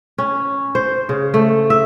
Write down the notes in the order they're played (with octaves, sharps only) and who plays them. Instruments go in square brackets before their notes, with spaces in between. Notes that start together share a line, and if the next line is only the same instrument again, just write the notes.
[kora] C#4
C5
C#3
A3
E5